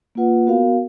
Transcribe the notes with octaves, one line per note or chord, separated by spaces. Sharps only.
A#3 F4 B4 F#5
B3 F#4 A#4 F5